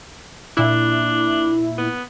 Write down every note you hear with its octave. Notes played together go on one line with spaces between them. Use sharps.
A#2 D4 E4
B3